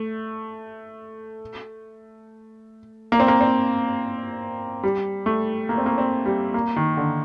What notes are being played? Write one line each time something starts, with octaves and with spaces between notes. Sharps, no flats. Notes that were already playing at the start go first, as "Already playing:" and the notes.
Already playing: A3
A#3
C4
A#3
C4
G3
A3
A#3
C4
A#3
C4
G3
A#3
D#3
D3